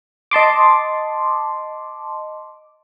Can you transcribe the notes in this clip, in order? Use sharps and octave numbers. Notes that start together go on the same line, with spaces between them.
D#5 A5 C6 D6